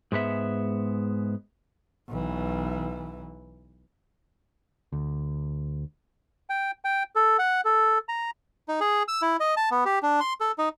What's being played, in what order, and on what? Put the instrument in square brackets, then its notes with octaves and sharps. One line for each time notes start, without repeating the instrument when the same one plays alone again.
[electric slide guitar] G#2 G#3 B3 E5
[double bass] B1 E3
[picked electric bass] D2
[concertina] G5
G5
A4
F#5
A4
A#5
D#4
G#4
E6
E4
D#5
A5
B3
G4
D4
C6
A4
D#4